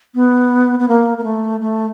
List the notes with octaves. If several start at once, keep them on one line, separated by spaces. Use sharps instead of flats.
B3
B3
A#3
A#3
A3
A3